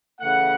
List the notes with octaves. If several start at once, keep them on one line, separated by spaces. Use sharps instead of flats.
C#3 E3 A3 F#5